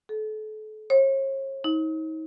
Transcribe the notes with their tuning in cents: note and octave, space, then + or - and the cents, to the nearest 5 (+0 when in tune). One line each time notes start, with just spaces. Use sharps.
A4 -35
C#5 -45
D#4 +35